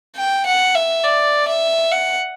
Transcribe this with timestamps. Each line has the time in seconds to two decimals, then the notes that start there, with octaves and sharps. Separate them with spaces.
0.16 G5
0.46 F#5
0.75 E5
1.04 D5
1.47 E5
1.91 F#5